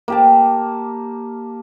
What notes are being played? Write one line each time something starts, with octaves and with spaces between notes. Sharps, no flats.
A#3 G4 A5